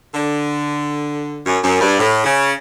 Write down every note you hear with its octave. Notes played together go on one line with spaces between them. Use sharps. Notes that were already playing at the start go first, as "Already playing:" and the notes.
D3
F#2
F#2
G2
A2
C#3